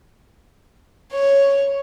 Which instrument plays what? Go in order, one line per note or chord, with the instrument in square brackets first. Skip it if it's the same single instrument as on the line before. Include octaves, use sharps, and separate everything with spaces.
[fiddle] C#5